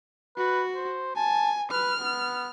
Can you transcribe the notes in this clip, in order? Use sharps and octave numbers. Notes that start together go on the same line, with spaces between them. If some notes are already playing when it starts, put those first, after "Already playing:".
F#4 B4
C5
G#5 A5
B4 F6
B3